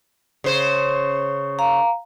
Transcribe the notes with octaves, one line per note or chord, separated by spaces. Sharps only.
C#3 C5
F5 A#5